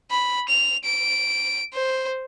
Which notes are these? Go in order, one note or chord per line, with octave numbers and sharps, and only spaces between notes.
B5
F7
D7
C5